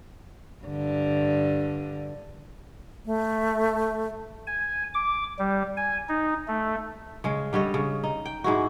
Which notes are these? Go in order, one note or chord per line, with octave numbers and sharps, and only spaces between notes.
G2 D3
A3
G#5
D6
G3
G#5
D#4
A3
C#3 G#3
D3 G3 C#5 D#5
C#3
D#4
G5
G#2 G#3 E4 F#4